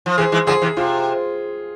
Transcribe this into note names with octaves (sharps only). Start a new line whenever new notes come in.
F3
C3 E3 G#4
E3 G#3
D3 F3 G#4
C3 E3
C3 F4